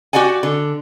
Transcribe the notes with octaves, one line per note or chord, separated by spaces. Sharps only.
F#4 G4 D5 F#5 G#5
D3